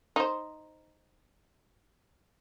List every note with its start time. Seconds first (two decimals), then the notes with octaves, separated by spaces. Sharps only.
0.16 D#4 C5